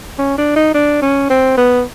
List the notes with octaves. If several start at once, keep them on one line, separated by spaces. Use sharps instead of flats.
C#4
D4
D#4
D4
C#4
C4
B3